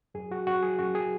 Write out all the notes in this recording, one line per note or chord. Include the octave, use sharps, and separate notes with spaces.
F#2 G#4
F#2 F#4
F#2 F#4
F#3 G#4
F#2 F#4
F#3 G#4